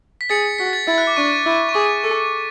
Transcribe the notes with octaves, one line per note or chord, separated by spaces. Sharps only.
B6
G#4 A6 C#7
F#4 B6
A6
E4 A6
F#6
D6
D4 C#6
E4
C#6
G#4 D6
A4